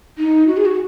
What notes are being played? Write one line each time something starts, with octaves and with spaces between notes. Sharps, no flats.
D#4
F#4
G#4
F#4